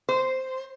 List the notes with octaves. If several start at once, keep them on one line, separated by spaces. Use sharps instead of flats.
C5